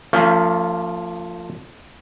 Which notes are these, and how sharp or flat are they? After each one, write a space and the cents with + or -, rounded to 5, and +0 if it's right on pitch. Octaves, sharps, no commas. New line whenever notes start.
F3 +0 A3 +45 C#4 +25